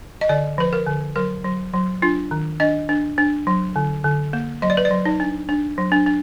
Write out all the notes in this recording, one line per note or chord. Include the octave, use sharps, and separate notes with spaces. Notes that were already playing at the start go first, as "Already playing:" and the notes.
D#5
D3 D5
F3 B4
A#4
D3
F#3 A#4
F#3
F#3
D4 F4
D#3
D4 D#5
D4
D4
F#3
D3
D3
A#3
F#3 D#5
D5
B4
D5
F#3
D#4
D4
D4
F#3
D4
D4